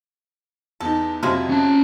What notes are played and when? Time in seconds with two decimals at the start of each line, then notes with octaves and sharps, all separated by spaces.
0.80 E2 D#4 A4
1.23 F2 C3 F3 F#3 G#3 E4
1.50 C#4 A5